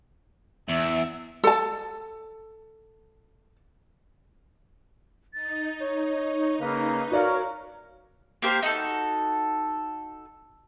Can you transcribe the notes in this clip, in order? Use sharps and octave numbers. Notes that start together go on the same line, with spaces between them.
E2 E5
A4 A5
D#4 A6
C#5
C#3 A#3 B4
F#4 A#4 C#5 D5 F5
A#3 G4 A#4 C5
D#4 F#4 A4